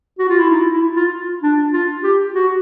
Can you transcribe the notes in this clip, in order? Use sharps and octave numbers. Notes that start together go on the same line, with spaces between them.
F#4
F4
E4
D#4
E4
F4
D4
F4
G4
F#4